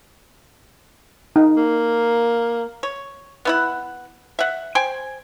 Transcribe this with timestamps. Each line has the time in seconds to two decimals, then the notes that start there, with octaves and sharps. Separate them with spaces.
1.36 D#4
1.56 A#3
2.83 C#5
3.45 B3 E4 F#5
4.39 E5 F#5
4.75 C5 G5 G#5